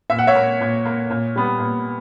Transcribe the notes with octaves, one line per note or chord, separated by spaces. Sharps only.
A#2 E5
F#5
C#5 E5
A#3
A#2
A#3
A#2
G3 B3
A#2